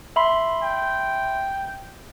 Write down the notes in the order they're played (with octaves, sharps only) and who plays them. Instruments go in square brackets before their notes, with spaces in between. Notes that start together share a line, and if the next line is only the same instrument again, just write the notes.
[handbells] E5 B5 C6
[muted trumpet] G5